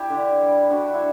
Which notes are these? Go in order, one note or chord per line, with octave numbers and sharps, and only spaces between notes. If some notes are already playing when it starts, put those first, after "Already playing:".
Already playing: D4 E4 G4
D3
G3
D3 D4 F#4
E4